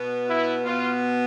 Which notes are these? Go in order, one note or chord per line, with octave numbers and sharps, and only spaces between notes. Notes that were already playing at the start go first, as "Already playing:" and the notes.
Already playing: B2 B3
E4
B2 B3 F4